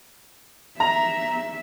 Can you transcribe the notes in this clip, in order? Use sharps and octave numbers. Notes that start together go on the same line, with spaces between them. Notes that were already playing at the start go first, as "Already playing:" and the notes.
E5 A#5